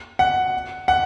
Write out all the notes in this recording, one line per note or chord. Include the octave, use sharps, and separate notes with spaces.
F#5
F#5